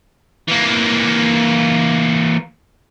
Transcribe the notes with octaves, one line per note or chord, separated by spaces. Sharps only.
E3 A#3